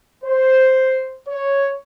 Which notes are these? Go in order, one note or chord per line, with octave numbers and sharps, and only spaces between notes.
C5
C#5